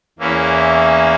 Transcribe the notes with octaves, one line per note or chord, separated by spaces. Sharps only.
E2 E3 A#3 C#4 E4